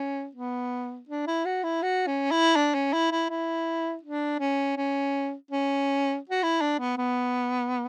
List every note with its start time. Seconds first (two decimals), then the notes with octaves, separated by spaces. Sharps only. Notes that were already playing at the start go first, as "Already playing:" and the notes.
Already playing: C#4
0.35 B3
1.09 D4
1.27 E4
1.46 F#4
1.64 E4
1.83 F#4
2.07 C#4
2.32 E4
2.56 D4
2.75 C#4
2.93 E4
3.12 E4
3.30 E4
4.04 D4
4.40 C#4
4.77 C#4
5.51 C#4
6.30 F#4
6.43 E4
6.62 D4
6.80 B3
6.98 B3